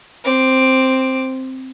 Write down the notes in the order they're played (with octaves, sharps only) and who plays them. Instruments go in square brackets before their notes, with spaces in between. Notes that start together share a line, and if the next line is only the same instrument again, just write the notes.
[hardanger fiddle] C4 D6